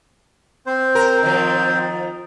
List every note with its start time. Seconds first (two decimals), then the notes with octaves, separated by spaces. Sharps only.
0.66 C4 C5
0.95 A#4
1.23 D#3 F3